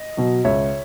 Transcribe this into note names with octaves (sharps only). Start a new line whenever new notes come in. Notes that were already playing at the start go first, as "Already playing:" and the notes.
Already playing: D#5
B2 F#3
C#2 C#5 E5